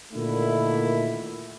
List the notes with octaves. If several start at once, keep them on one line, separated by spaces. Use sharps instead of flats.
A#2 D3 D#3 A3 E4